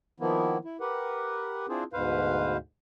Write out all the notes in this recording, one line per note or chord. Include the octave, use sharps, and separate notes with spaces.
D#3 F3 A#3 B3 E4
E4
G4 A#4 B4 F#5
C4 D4 E4 F4 G#4 C5
D2 G#2 B2 B4 C5 F5